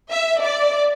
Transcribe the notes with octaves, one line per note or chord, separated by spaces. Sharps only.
E5
D5